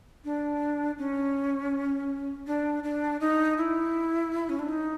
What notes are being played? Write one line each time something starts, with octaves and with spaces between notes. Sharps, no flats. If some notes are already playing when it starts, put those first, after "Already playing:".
D4
C#4
D4
D4
D#4
E4
C#4
D4
D#4